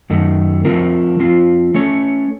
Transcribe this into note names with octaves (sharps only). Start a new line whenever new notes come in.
F#2 D#3 A3
F3 A3 C4 F4 A#4
F3 C4 F4
A3 C#4 A4 C#5